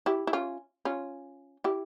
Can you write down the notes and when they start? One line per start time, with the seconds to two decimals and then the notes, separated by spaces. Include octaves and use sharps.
0.06 E4 G4
0.27 E4
0.33 C#4 F4
0.85 C#4 F4
1.64 E4 G4